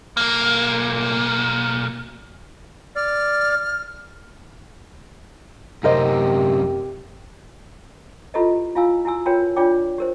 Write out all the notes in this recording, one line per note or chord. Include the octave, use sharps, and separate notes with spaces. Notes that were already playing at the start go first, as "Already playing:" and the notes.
B1 A#3
D5 F6
F#2 C3 G4 A#4 C5 D#5
E4 F4 G4 A4 B4 D#5
E4 F4 F5 G#5 E6
E4 F#4 G#5 E6
F4 F#4 A#4 B4 C#5 G5
D4 F4 C#5 D5 G5 D6
G4 A#4 C5